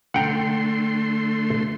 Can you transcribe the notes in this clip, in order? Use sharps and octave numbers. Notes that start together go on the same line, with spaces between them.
D3 A3 F#5 G5 A#5 C6